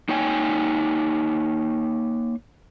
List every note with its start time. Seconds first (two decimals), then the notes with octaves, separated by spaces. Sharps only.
0.09 A#3 D#4 C#5 G5 G#5